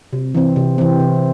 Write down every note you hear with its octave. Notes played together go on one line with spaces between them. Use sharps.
C3
E3 C4
C3
E3 C4
C3